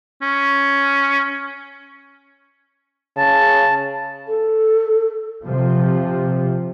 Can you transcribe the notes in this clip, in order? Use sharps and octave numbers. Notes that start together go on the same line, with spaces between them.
C#4
C#3 A5
A4
C3 F3